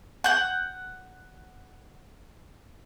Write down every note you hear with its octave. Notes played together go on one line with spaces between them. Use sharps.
F#5 G6